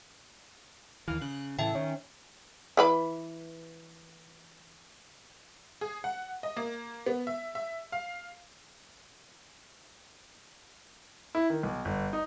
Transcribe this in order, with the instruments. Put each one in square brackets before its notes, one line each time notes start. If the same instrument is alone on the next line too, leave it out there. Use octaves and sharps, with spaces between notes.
[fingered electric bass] D#2 E3 [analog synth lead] F5
[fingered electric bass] C#3 [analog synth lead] F#6
[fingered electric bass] A2 C#3 E3 [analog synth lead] A4 [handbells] E5 G5
[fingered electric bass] D#3 [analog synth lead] C#4
[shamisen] E3 B4 B5
[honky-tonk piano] G#4
F#5
D#5
A#3
B3
E5
E5
F5
[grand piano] E4
D#3
B1
G1
D#4